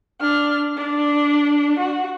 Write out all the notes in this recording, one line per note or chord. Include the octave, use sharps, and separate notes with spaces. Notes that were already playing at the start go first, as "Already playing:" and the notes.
D4 F6
D4
F#4